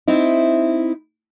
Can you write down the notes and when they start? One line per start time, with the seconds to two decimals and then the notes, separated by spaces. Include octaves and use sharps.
0.08 C4 D#4 E4